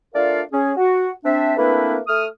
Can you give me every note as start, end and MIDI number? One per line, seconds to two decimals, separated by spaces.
0.14 0.41 57
0.14 0.41 62
0.14 0.41 65
0.14 0.41 70
0.14 0.41 74
0.14 0.41 77
0.52 0.72 61
0.52 0.72 68
0.77 1.10 66
1.24 1.55 60
1.24 1.55 62
1.24 1.55 76
1.57 1.97 57
1.57 1.97 58
1.57 1.97 60
1.57 1.97 62
1.57 1.97 64
1.57 1.97 71
2.07 2.26 57
2.07 2.26 87
2.07 2.26 89